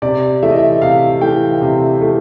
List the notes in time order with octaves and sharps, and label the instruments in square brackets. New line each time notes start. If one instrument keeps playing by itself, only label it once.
[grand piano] C3 D5
E3 A3 E5
D#5
E5
C3 F5
E3 A3 G5
C3
E3 A3